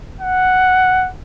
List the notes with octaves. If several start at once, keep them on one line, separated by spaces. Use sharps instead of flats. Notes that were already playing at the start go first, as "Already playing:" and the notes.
F#5